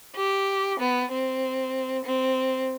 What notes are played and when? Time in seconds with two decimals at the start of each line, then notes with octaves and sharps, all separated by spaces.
0.15 G4
0.79 B3
1.11 C4
2.05 C4